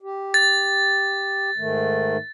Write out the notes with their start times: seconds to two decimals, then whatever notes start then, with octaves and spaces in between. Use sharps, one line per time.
0.02 G4
0.34 A6
1.57 G#2 D#3 A3